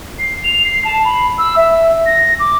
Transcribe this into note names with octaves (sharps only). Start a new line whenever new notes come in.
C7
F7
C7
A5
B5
E6
E5
A#6
D6